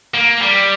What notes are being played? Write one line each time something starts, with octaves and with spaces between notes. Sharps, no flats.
A#3
G3